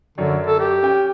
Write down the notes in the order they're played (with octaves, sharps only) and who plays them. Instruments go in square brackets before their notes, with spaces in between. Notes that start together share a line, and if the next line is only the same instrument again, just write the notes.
[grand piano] F#2 C#5 D5 [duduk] D3
[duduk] A4
G4
[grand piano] C#4 G5